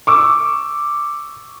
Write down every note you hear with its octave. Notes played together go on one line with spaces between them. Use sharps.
C#6 D6 E6